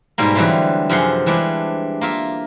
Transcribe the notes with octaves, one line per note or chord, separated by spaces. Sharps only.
G#2 B2 G3 A#3
D3 E3 F#3 G3 A3 C4
F#2 C3 F3 G#4 F#5 C6
E3 G3 G#3 D4
A#3 F4 E5